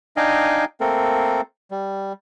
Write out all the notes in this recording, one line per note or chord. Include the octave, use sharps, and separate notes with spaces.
D4 D#4 D#5 F5 G5 G#5
A3 A#3 C4 A4 A#4
G3